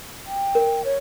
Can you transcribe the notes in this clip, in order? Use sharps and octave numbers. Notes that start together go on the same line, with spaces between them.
G5
A#4
C#5